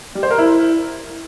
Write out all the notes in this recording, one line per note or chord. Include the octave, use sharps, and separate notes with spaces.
G3
C5
A#4
E4